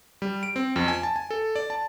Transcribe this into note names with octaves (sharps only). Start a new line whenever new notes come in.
G3
D7
C4
F2
G#5
A5
G#5
A4
D5
A5